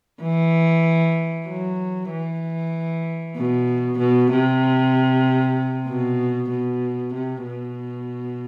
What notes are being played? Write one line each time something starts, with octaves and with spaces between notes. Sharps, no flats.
E3
F#3
E3
B2
B2
C3
B2
B2
C3
B2